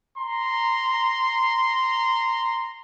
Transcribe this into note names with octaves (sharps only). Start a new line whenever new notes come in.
A#5 C6